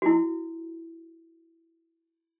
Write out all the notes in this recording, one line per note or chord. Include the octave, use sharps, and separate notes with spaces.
E4 F#4